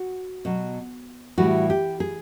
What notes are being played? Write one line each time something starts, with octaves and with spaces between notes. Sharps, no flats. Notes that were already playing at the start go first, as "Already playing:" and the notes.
Already playing: F#4
B2 F#3
A2 E3 G3 F#4
G4
G#4